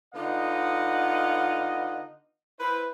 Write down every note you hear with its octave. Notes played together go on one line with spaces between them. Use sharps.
D3 B3 D#4 F4 D#5 F#5
E4 B4 C5